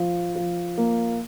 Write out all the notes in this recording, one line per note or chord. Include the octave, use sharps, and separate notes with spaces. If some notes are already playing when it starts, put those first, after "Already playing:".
Already playing: F3
F3
A#3